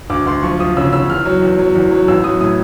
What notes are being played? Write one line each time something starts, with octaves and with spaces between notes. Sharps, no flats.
D2 D6
D2 C6
F3 C#6
F3 D#6
C#3 E6
C#3 E6
E2 F6
F#3
E2
F#3
E2
F#3
A1 E6
F#3 D#6
A2 D#6